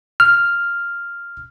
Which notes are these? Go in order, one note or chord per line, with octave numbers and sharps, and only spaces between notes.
F6